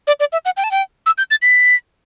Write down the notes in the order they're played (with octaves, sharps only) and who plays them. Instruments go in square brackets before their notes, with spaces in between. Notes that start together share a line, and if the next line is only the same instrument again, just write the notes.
[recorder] D5
D5
E5
F#5
G5
A5
G5
E6
G6
A6
B6